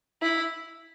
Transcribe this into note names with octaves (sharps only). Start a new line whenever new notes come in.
E4